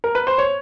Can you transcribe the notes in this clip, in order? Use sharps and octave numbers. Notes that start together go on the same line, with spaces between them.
A#4
B4
C5
C#5